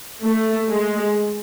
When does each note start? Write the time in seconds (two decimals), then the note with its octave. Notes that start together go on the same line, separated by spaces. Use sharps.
0.23 A3
0.69 G#3